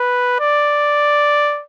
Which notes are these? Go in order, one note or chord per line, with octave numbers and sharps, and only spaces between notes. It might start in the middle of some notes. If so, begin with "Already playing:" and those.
Already playing: B4
D5